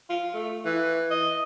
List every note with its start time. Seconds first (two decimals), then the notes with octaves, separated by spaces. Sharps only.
0.10 F4
0.34 A3
0.65 E3
1.11 D#5